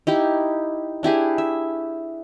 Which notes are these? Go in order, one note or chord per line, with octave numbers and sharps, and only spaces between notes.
D#4 E4 G4
D4 E4 G4 G#4
E5